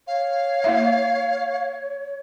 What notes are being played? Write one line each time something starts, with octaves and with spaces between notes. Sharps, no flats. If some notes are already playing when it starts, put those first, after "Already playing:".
C#5 F5
A#3 E4 E5